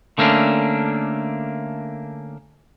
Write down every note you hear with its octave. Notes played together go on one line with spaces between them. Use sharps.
D3 A3 A#3 C#4 D4